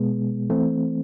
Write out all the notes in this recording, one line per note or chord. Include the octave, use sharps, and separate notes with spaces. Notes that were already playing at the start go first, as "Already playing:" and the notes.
Already playing: B2 G#3 B3
E3 A3 C4